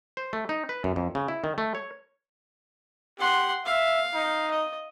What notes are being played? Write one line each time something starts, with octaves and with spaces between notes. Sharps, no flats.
C5
A3
D#4
B4
F#2
F2
C#3
E4
D#3
A3
C#5
G4 F#5 C6
E5 F5
D#4
D#5